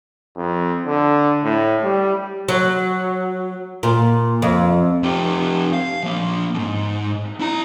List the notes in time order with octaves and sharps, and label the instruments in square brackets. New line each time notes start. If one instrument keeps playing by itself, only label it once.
[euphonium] F2
D3
A2
G3
[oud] F#3
A#2
F2
[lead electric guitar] F2 G4
F5
F3 A#3
F2 G#2
E4 A#5